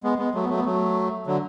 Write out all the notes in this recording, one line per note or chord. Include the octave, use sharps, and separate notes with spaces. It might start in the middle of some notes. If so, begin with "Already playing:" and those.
G#3 B3
G#3 B3
F#3 A3
B3
F#3 A3
B3
F#3 A3
D3 F#3